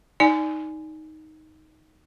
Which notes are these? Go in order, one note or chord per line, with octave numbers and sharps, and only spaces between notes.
D#4 D5 G#5